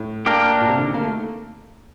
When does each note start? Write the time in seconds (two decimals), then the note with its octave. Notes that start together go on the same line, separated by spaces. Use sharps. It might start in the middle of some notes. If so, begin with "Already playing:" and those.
Already playing: A2
0.26 A#3 D4 G4 A#4
0.61 A#2
0.69 C3
0.77 D3
0.86 D#3
0.94 A#3
1.02 A3